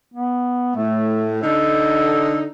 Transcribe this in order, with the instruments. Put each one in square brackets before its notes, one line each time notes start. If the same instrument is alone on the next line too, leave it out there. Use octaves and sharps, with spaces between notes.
[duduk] B3
[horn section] A2 [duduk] A3
[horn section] D3 D#4 [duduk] A4